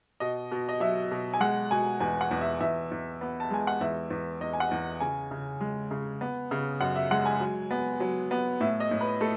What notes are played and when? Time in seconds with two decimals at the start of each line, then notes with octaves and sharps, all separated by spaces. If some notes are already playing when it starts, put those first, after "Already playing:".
0.20 B2 D#5
0.51 B2
0.69 D#5
0.80 F#3 E5
1.11 B2
1.34 G#5
1.40 G#3 F#5
1.71 B2 G#5
2.00 E2 G#5
2.21 F#5
2.31 E2
2.41 E5
2.61 E2 E5
2.91 E2
3.21 B3
3.40 A5
3.50 G#3 G#5
3.67 F#5
3.81 E2 E5
4.10 E2
4.41 E2 D#5
4.53 G#5
4.60 F#5
4.71 E2
5.00 C#3 G#5
5.31 C#3
5.61 G#3
5.91 C#3
6.21 B3
6.51 C#3
6.81 F#2 F#5
6.96 E5
7.11 G#3 F#5
7.26 G#5
7.40 F#3
7.71 B3
8.00 F#3
8.31 B3
8.60 A2 E5
8.80 D#5
8.91 A2
9.01 B4
9.21 A3 A4